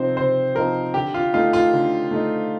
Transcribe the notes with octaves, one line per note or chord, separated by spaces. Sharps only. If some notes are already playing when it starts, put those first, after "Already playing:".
Already playing: C3 F3 C4 D#4 C5
C3 C5
F3 C4 D#4 A#4
D3 G4
F4
A3 D#4 F4
F4
D3
A3 D#4